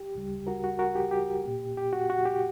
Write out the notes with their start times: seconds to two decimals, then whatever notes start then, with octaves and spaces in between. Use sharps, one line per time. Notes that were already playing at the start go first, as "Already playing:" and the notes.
Already playing: G4
0.15 D2 C#3 G3
0.47 F#4 A#4
0.64 F#4
0.79 F#4 A#4
0.95 G4
1.11 G4
1.45 A#2 A#3
1.77 G4
1.93 F#4
2.10 F#4
2.26 G4